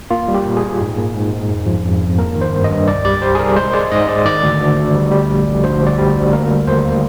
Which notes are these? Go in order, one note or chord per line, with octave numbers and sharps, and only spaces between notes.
A#3 F4
G3
G4
A#2
G#4
A#2
G#2
A#3
G#2
G#2
F2
F3
F2
F2
A#3 A#4
D#3
C5
G2
D#5
G2
C2 D5
G3 D5
G3 C5
G#4
C2 A#4
G#3 C5
G#3 D5
G#2 D#5
G#3 D5
D#3 D5
D2
D2
D2
G3
G3
A#1
A#1
D2 C5
G3
D5
G3
D2
A#3 A#4
G3
D#2 C5
A#3